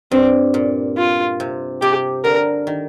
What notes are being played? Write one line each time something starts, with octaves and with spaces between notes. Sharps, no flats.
G2 C4
A#2
F4
C3
C3 G4
D3 A#4
D#3